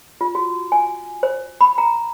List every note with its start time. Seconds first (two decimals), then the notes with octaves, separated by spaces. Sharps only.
0.21 F4
0.35 F#4
0.72 G#5
1.23 C5
1.61 B5
1.78 A#5